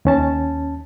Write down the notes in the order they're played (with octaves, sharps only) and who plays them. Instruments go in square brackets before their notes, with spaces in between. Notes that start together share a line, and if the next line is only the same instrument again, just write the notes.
[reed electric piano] D#2 C#4 A5